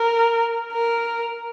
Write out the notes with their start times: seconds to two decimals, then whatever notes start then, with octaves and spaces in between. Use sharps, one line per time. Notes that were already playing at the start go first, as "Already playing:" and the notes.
Already playing: A#4
0.73 A#4